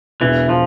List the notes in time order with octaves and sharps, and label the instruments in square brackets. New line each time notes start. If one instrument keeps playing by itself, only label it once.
[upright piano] E1 [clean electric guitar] E3
[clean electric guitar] F3